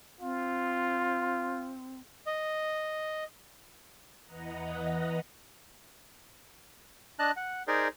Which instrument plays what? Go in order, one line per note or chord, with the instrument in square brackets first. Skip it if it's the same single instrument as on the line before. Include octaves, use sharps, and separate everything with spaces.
[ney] C4 [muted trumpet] F4
[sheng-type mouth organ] D#5
[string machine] E2 E3 B4 D#5 F#5 A#5
[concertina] D4 D#5 A5 F#6
F#5
D#4 G#4 A#4 C5 D5